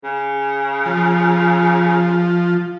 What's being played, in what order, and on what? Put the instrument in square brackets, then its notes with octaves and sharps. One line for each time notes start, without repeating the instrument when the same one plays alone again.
[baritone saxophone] C#3
[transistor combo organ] F3